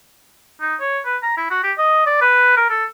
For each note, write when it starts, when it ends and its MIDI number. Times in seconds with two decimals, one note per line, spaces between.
0.61 0.75 63
0.80 0.99 73
1.05 1.17 71
1.23 1.34 82
1.37 1.47 64
1.50 1.61 66
1.64 1.72 67
1.78 2.03 75
2.06 2.17 74
2.21 2.56 71
2.57 2.68 70
2.70 2.85 69